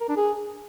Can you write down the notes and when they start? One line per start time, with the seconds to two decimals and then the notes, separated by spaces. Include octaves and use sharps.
0.01 A#4
0.09 D4
0.17 G#4